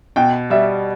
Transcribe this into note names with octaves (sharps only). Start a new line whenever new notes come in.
B2 G5
G3 E5